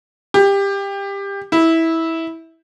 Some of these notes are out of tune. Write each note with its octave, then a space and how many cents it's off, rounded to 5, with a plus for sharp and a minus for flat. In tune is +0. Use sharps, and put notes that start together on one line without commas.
G4 +20
E4 -15